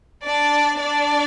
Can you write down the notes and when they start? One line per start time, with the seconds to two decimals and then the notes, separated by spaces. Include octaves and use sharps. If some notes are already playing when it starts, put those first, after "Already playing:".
0.25 D4 D5
0.79 D4 D5